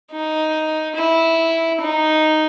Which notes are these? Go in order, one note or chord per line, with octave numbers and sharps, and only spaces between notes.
D#4
E4
D#4